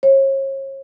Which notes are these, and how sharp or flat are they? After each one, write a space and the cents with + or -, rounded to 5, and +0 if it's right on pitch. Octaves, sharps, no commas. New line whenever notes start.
C#5 -40